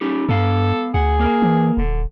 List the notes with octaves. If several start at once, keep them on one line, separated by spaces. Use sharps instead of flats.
C#4 D#4 G4
G2 B3 A4 F5
D2 G#4 F#5
A#3 A#4
E3
D#1 D3